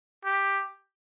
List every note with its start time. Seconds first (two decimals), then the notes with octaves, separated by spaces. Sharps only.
0.25 G4